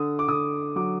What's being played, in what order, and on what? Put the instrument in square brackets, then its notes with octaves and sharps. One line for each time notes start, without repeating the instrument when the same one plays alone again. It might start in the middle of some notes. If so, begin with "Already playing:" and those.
Already playing: [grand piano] D3 D#6
D6
D3 D#6
F#3 D6